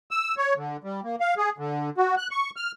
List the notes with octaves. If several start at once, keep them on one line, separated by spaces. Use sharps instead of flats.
E6
C#5
D3
G3
A#3
F5
G#4
D3
F#4
F#6
C#6
F6